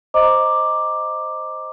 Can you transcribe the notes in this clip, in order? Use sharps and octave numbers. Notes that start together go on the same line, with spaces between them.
C5 D#5 A#5 D6